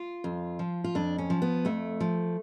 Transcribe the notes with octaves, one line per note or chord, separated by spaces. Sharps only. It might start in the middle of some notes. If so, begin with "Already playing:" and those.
Already playing: F4
F2
F3
F4
F2 D4
C#4
F3
B3
F2 A3
F3